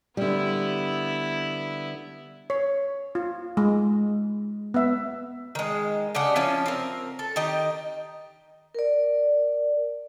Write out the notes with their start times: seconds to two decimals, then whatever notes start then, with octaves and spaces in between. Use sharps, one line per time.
0.17 D3 G3 B3 E4
2.50 C#5
3.15 F4
3.57 G#3
4.74 B3 E5
5.55 D#3 G#3
6.15 C#3 D4 G4 F#5
6.36 F3 C#4 E4 F4
6.66 C4 A#4
7.19 A4
7.36 D#3 D#4 G4
8.75 A#4 D5